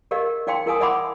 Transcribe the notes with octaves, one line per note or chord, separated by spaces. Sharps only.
G4 A#4 D5 D#5 F5
D#4 D5 F5 G5 C6
E4 A#4 F5 G#5 D#6
D5 E5 F#5 B5 C6 D6